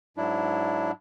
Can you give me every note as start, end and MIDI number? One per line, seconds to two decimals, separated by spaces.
0.17 0.91 44
0.17 0.91 54
0.17 0.91 62
0.17 0.91 64